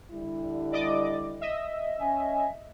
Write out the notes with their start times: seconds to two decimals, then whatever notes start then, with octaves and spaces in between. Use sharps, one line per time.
0.11 D3 G3 E4
0.72 D5 D#5 D6
1.41 D#5 E5
2.00 C#4 G#5